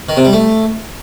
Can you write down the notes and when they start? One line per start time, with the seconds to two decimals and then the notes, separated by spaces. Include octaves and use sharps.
0.09 D#3
0.17 C3
0.25 G3
0.33 A3